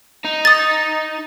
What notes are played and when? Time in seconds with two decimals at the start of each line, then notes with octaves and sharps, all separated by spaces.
0.24 D#4
0.45 D#6 A6